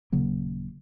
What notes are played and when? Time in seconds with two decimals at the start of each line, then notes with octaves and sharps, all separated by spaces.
0.12 D#1 C#3 F#3 A#3